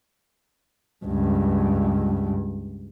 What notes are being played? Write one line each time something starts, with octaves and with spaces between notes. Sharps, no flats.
C#2 G2